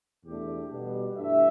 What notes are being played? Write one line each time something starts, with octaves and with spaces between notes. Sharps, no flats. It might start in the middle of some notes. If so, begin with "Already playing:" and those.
E2 B2 A3 D4 G4
B2 G3 B3 D4
G2 E3 A3 D4 E5